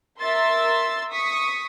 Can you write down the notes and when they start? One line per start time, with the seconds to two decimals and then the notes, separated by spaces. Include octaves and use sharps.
0.21 A#4 E5 C6 E6 A6
1.11 C#6 D#6 B6